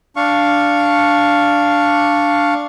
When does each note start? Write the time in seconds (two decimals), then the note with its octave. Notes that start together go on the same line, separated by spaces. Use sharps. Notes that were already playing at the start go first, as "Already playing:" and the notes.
0.16 D4 F5 C#6